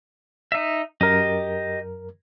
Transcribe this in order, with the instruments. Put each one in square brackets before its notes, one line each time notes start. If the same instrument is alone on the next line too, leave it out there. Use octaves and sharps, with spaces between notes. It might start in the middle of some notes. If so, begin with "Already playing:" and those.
[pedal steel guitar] D#4 E5
[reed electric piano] F#2 A#4 [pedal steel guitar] G4 D#5